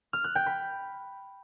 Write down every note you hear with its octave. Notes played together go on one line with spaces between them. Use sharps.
F6
F#6
G5
B5